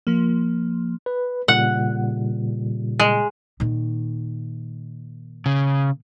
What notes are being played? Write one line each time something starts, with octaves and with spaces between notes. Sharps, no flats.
F3 A#3
B4
A#2 C#3 G3 F#5
G#3
A#2 D#3
C#3